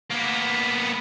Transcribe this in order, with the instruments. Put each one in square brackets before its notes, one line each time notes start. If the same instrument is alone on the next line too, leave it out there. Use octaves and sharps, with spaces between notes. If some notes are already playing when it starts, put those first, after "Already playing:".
[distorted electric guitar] A#3 B3